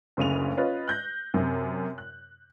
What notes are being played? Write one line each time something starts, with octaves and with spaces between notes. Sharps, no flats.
F#1 D2 C#3 D#7 F7
C#4 F4 B4 D#5
F#6 G6 A#6
F#2 C3
F#6